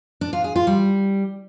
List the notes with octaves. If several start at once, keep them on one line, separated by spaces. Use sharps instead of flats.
D4
F4
G#4
F4
G3